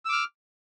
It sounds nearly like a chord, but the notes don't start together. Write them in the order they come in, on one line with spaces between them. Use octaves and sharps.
E6 D6 F6